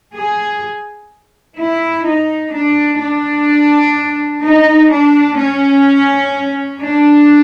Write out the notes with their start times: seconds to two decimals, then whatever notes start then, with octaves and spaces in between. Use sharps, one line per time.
0.14 G#4
1.56 E4
2.05 D#4
2.53 D4
3.00 D4
4.42 D#4
4.90 D4
5.37 C#4
6.80 D4